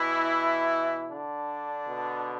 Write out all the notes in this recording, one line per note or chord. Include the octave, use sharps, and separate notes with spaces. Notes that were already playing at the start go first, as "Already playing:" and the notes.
Already playing: B2 E3 E4
D3 D4
B2